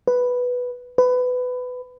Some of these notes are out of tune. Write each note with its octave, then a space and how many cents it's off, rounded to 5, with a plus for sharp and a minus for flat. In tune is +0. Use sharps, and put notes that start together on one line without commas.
B4 +0
B4 +20